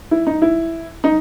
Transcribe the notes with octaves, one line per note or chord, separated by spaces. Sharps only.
E4
D#4
E4
D#4